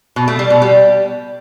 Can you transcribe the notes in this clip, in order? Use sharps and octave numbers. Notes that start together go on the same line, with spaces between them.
B2
A3
G3
B2
G3